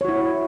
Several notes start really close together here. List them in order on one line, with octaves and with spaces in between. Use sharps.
C#5 F#4 E4